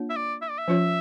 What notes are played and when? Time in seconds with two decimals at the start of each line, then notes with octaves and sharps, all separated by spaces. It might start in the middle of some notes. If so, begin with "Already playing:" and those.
Already playing: A#3 D4 F4 C#5
0.10 E5
0.16 D5
0.42 E5
0.50 D5
0.58 E5
0.68 F3 C#4 F4 C#5